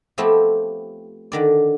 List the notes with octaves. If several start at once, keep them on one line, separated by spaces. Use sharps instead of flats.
F3 A3 B3 C4 E4 G4
D3 D#3 D5